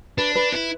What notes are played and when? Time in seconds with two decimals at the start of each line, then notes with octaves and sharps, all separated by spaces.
0.18 D4 B4
0.35 B4
0.52 E4 B4